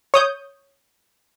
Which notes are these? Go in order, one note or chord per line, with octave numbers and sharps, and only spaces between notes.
C#5 D#6 G6